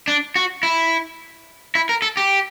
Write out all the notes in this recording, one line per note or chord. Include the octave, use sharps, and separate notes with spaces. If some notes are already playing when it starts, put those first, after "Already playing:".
D4
F#4
E4
E4
A#4
A4
G4